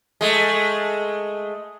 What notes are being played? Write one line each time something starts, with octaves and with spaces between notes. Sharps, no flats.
G#3 A3